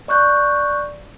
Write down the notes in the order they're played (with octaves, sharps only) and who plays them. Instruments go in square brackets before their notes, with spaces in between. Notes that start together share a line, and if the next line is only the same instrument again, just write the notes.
[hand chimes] D5 C#6 F#6 G6